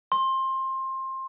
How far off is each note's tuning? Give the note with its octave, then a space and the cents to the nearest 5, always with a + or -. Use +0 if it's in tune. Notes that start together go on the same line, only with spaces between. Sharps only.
C6 +20